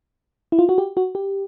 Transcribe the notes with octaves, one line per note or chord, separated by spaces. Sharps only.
E4
F4
F#4
G4
F#4
G4